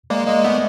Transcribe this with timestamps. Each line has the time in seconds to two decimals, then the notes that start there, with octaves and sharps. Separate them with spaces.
0.10 G#3 A#3 D5
0.27 G#3 A#3 D#5
0.44 A3 B3 E5